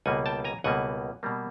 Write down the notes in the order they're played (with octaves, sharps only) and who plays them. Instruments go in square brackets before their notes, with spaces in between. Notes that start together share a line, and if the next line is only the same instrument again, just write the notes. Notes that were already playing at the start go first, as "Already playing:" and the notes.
[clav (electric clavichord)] C#2 B2 G3 A#3 F#5 G#5
G5 A5
G#5 A#5
C#2 B2 G3 A#3 F#5 G#5
B2 G3 A#3